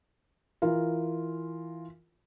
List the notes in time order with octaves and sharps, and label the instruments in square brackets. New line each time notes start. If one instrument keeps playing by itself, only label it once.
[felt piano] E3 F4 A#4